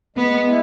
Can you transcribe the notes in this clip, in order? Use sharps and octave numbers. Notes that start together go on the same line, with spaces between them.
G#3 B3
E4